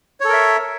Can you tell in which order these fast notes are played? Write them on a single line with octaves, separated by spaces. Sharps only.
C#5 A4 A#4 E5